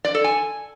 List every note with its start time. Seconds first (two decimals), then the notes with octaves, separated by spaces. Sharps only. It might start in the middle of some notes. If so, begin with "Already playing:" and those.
0.05 D5
0.14 A4
0.24 G#5